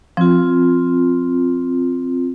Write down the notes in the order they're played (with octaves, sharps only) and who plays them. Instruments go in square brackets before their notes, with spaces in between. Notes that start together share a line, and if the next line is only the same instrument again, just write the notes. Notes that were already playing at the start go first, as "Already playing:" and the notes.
[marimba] F3 [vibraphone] C4 F4